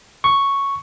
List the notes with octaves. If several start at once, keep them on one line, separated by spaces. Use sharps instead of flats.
C#6